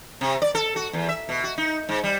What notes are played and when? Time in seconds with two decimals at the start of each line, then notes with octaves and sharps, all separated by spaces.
0.21 C3
0.42 D5
0.55 A4
0.76 F#4
0.93 E2
1.09 E5
1.29 B2
1.44 F#4
1.58 D#4
1.89 G#2
2.04 G3